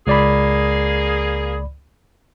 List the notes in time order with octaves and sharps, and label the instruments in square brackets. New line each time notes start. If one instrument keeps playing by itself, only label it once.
[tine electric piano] C#2 D5 B5 [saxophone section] A#3 G#4